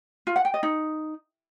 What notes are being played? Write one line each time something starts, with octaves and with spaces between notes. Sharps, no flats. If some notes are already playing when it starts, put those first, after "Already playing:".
F4
F#5
G5
D#5
D#4